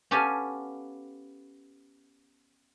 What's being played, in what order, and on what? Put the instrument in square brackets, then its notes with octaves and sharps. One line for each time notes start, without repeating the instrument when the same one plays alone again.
[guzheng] B3 C#4 G4 A4 F5 G#5